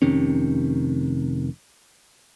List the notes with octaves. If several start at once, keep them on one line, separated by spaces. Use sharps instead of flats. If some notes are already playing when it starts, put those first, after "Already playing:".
F1 C3 D#3 C#4